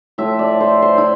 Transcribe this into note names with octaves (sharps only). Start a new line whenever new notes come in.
A2 F3 A3 E5
D5
C5
C5
E4